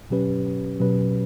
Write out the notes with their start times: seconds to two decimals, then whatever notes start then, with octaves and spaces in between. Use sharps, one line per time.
0.10 B2 F#3 C#4 G4 B4
0.80 B2 F#3 C#4 G4 B4